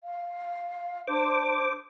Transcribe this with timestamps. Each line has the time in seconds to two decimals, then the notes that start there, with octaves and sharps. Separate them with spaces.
0.03 F5
1.07 D4 C5 D6